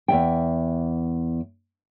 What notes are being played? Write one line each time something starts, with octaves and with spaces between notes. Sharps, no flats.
E2 E5 G5